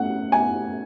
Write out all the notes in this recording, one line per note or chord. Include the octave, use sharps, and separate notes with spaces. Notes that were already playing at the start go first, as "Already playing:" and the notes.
Already playing: A3 C#4 F#5
G#5